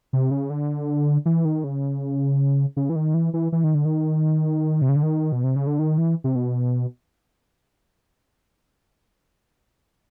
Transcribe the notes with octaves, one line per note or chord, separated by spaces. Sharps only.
C3
C#3
D3
E3
D#3
C#3
C#3
E3
D#3
E3
E3
E3
D#3
D3
D#3
C3
C#3
D3
D#3
B2
C3
C#3
D3
D#3
E3
C3
B2